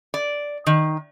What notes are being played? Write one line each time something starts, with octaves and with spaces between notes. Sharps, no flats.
D5
D#3